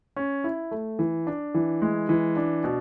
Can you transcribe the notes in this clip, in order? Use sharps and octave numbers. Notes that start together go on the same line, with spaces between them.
C#4
E4
A3
E3
D4
E3
G#3
E3
D4
B2